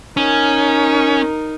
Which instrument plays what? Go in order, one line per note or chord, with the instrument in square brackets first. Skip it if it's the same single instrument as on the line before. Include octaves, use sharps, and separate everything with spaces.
[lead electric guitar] C#4 [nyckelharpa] D#4 A#4